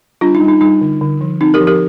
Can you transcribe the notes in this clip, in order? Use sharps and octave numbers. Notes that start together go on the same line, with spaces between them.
G3 D4 F4
D#4
G3
D#4
G3 D#4
D3
D3
F3
C4 D#4
G4 A#4
F3
G4 A#4